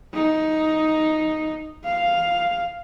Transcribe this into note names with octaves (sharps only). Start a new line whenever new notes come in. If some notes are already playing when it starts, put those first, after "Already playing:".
D#4
F5